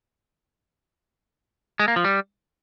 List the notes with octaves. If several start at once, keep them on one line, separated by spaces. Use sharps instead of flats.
G#3
A#3
F3
G3